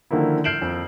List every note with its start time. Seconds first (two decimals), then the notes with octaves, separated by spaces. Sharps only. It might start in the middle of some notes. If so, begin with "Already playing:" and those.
0.11 D3 D#3 F3 A#3 E4
0.44 F6 G6 C7 D7 E7 F#7
0.62 F2